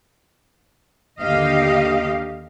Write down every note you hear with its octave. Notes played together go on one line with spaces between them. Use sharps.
D#2 D3 A#3 G4 D#5 F5